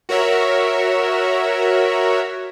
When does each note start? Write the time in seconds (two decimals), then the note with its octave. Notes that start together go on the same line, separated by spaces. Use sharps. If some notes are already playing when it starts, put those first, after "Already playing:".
0.09 F#4 A#4 C#5 E5